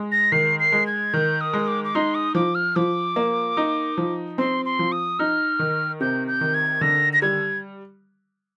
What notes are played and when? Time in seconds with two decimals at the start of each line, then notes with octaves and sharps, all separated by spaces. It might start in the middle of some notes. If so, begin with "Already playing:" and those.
Already playing: G#3
0.12 A#6
0.32 D#3 C7
0.60 C7
0.72 G#3
0.87 G#6
1.14 D#3 G6
1.41 D#6
1.53 G#3
1.68 D6
1.84 D6
1.95 D#4 C6
2.15 D#6
2.35 F3 D6
2.55 F6
2.76 F3 D6
3.16 A#3
3.57 D#4
3.97 F3
4.38 C4 C6
4.65 C6
4.79 F3
4.92 D#6
5.19 D#4 F6
5.59 D#3
6.01 C3 G6
6.27 G6
6.41 D#3
6.54 G#6
6.81 D3 A#6
7.13 A#6
7.22 G3 G#6